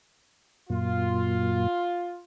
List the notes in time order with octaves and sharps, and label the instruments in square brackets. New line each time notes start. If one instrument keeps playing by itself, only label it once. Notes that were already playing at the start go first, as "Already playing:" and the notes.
[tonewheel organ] F#2 A#2 [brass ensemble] F4